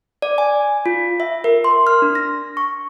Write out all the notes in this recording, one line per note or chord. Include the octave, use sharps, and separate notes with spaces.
D5
G#5
F4
E5
A#4
C6
F6
D4
A#6
C#6